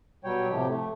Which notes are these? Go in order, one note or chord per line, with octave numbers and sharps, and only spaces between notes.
B2 F#3 G3 C#5 G5
A2 C3 F3 G4
A3